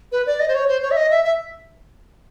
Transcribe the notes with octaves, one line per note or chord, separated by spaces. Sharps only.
B4
D5
D#5
C5
C#5
C5
C#5
E5
D#5
E5
E5